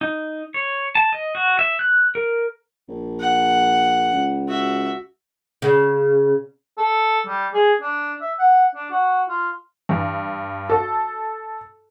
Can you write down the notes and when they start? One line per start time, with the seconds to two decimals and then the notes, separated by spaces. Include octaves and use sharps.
0.01 D#4
0.54 C#5
0.95 A5
1.13 D#5
1.35 F#4
1.59 E5
1.79 F#6
2.15 A#4
2.88 A#1
3.20 F#5
4.13 C#2
4.48 F#4 E5
5.62 C#3
6.78 A4
7.27 G3
7.54 G#4
7.81 D4
8.21 E5
8.39 F#5
8.75 D4
8.91 F#4
9.29 F4
9.89 G2 E3
10.70 F#4 A4